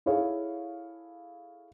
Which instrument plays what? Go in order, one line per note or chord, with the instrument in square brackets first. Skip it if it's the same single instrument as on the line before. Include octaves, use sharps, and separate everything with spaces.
[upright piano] E4 G#4 A4 C#5 F5